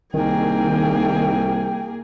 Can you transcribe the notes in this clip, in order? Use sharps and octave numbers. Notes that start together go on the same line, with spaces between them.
C2 D#3 A#3 G#4 G5